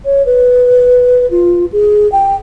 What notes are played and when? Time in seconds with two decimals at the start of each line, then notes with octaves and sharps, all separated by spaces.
0.05 C#5
0.26 B4
1.31 F4
1.73 G#4
2.12 G5